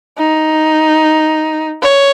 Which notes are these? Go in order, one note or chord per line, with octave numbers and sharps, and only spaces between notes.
D#4
C#5